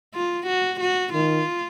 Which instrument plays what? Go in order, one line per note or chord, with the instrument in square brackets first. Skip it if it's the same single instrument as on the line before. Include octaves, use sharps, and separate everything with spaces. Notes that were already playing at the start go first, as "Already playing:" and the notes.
[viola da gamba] F4
F#4
F#4
[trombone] D#3 [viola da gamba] F4